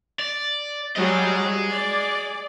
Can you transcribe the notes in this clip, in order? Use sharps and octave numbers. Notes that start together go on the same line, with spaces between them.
D5
F#3 G3 G#4 D#5
D5